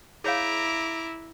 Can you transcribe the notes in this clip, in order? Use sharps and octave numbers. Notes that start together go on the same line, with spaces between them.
E4 G#4 C#5 F5 A#5 D6